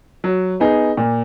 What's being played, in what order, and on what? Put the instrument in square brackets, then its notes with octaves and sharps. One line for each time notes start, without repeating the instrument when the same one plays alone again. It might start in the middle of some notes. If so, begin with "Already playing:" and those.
[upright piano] F#3
B3 D#4 G#4
A#2